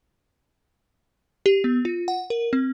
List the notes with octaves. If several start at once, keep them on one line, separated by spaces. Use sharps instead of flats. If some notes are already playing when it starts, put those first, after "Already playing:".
G4
B3
F4
F#5
A#4
C4